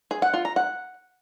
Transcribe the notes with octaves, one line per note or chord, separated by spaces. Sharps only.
G#4
F#5
F4
A#5
F#5